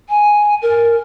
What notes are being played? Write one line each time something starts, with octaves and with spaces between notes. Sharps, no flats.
G#5
A#4